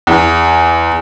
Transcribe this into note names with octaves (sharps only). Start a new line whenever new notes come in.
E2